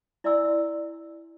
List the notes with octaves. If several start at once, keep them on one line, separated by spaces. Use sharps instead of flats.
E4 D5 E5 G#5 C6 E6